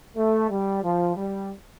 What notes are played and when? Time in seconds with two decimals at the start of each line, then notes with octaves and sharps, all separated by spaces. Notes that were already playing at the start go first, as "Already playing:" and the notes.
0.17 A3
0.50 G3
0.83 F3
1.16 G3